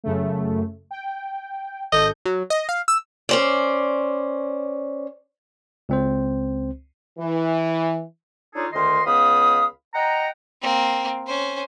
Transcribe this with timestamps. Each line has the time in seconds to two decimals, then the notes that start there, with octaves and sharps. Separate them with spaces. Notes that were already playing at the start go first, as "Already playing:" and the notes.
0.04 F#2 C#3 A3
0.91 G5
1.92 G#1 A4 D#5 G6
2.25 F#3
2.50 D#5
2.69 F5
2.88 E6
3.29 C#4 C5 D5
5.89 C#2 C4 C5
7.18 E3
8.55 D4 D#4 F4 G#4 A4 C#5
8.73 D2 D#3 D#5 C6
9.06 C#2 B3 F5 B5 D#6
9.95 D#5 F#5 G5 A#5
10.62 A#3 C4
11.26 C#4 C5